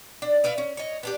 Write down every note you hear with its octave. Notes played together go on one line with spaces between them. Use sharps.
D4
B3 D5 E5 F5
C#4
C#5 D#5
B3 D4 G4